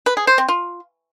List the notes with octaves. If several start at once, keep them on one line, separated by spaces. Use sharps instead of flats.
B4
G#4
C5
C4
F4